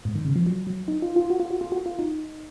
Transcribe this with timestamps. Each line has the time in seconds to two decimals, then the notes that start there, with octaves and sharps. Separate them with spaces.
0.05 G#2
0.15 D#3
0.25 C#3
0.36 F3
0.46 F#3
0.67 F#3
0.88 D#4
1.02 F4
1.16 F4
1.30 F#4
1.40 F4
1.51 F#4
1.61 F4
1.72 F#4
1.86 F4
1.99 D#4